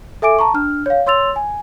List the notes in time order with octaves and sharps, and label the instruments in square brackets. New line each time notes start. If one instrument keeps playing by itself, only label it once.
[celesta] A4 E5 G#5 D6 D7
A5 A#5 C#6
D4 F6
C#5 F5
C#5 C6 E6 A6 F7
G#5